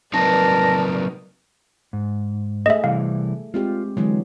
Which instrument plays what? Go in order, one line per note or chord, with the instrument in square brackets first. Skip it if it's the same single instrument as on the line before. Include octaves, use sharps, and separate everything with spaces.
[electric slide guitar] F#3 C4 D#4 [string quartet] A#4 B4 D5 [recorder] A5 [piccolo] A#6
[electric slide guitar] G#2
[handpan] A3 G#4 [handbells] D#5 E5
[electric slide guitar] C3 E3 G3 [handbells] F5
[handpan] G#3 C4 G4 [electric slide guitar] F4
[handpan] D3 E3 F#3 [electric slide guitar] G#3